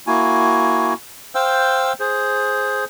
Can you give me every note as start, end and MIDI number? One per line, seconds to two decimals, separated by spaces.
0.07 0.94 58
0.07 0.94 64
0.07 0.94 66
0.07 0.94 80
1.35 1.93 72
1.35 1.93 77
1.35 1.93 79
1.35 1.93 88
2.00 2.85 68
2.00 2.85 72